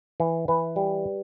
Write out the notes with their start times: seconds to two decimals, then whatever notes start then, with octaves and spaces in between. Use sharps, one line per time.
0.20 E3
0.48 E3 B4
0.76 G3